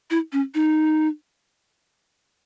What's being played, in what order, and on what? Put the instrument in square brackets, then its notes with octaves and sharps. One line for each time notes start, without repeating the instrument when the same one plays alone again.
[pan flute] E4
C#4
D#4